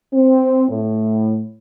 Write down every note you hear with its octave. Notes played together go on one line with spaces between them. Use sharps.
C4
A2